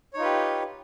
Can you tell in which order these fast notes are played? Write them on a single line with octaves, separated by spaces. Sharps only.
C#5 D#4 F4 B4 G4